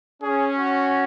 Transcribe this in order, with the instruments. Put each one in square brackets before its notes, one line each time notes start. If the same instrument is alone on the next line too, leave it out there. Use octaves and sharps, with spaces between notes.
[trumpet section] C#4 [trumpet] G#4
[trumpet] F#4